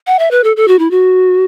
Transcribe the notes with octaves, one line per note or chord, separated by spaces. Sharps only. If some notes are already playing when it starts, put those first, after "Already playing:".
F#5
E5
B4
A4
A4
F#4
E4
F#4